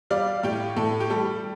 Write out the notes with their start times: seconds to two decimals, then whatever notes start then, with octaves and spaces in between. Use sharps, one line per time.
0.10 G3 D5 F5
0.43 A2 G4
0.77 A2 A4
1.00 G4
1.10 G3 A4